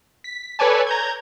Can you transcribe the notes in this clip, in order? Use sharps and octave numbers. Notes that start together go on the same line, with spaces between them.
B6
A4 B4 C#5 D5 G#5 A5
A#5 G6 G#6